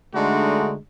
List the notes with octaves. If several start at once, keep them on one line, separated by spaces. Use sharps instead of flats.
D3 G#3 A3 D4 D#4 F#4